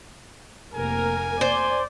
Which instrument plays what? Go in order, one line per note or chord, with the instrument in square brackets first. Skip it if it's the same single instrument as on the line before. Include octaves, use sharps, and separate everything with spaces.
[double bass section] F1 C3 A#3 [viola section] A#4 [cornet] G#5
[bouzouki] C5 [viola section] D5